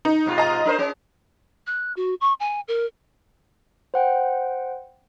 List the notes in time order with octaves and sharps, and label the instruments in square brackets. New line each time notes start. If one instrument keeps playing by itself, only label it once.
[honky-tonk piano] D#4
[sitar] G#2 B2 F4
[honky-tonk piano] D#5 A#5
[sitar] D4 A#4 C5
C#4 G#4
[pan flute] F#6
F#4
C#6
G#5
A#4
[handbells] C5 F#5 G5